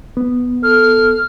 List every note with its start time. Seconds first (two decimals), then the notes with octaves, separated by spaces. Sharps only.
0.17 B3
0.63 A4 F6